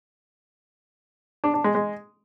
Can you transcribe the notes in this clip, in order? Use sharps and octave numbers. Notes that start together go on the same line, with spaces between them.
D4
D4
G#3
G#3